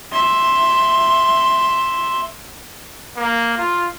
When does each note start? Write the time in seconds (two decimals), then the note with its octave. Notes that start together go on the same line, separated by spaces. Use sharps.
0.12 E5 C6
3.17 A#3
3.58 F4